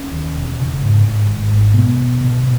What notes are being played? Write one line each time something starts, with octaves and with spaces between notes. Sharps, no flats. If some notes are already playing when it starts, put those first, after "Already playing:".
Already playing: C#4
D#2
E1
C#3
G#2
G#2
G#1
G#2
B2 B3
B2
B2
B2